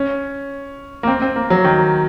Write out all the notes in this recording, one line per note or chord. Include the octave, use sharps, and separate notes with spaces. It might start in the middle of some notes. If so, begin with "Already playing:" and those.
Already playing: C#4
A#3
C4
C4
A#3
F#3
D#3